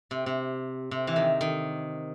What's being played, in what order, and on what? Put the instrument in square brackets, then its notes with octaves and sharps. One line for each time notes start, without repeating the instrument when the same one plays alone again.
[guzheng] C3
C3
C3
E3
D#3
D#3